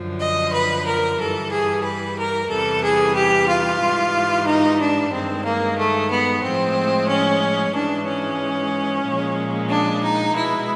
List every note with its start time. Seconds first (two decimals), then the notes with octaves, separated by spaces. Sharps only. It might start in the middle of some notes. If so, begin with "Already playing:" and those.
Already playing: F#2 D3 F3
0.20 D#5
0.53 B4
0.85 A#4
1.19 G2 E3 G3 A4
1.50 G#4
1.83 B4
2.17 A#4
2.49 E2 C3 E3 G3 A4
2.82 G#4
3.15 G4
3.47 F4
3.80 G#2 E3 G3
4.46 D#4
4.79 D4
5.11 G2 D#3 G#3 C4
5.43 A#3
5.77 A3
6.10 B3
6.43 A2 F3 G#3 C4
7.08 C#4
7.73 G#2 E3 G#3 D4
8.06 C#4
9.04 A#2 F3 G#3
9.69 D4
10.03 D#4
10.36 B2 G#3 E4